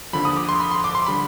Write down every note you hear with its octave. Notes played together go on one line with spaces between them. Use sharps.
D#2 D3 F3 B5
D#6
D6
C6
B5
C6
D6
C6
D3 G3 B5